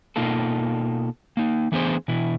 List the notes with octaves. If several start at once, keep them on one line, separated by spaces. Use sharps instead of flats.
B2 A#3 D#4 F4 A4
A#3 D#4
E3 A3 B3 D4 G#4 C5
B2 E3 E4